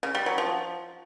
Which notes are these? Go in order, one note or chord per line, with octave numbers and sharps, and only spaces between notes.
C#3
G3
F#3
F3